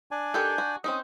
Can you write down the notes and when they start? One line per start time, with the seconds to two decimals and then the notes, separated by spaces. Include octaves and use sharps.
0.11 D4 D5 G#5
0.34 D#3 G4 A4 G6
0.58 F#4
0.84 C4 C#4 D#4 D#6